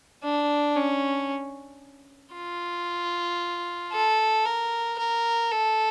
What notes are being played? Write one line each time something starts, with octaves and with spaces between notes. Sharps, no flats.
D4
C#4
F4
A4
A#4
A#4
A4